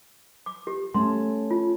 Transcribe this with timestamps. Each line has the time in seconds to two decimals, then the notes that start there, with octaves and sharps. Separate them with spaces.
0.46 D6
0.67 G4
0.94 A3 C#4 C6
1.51 F4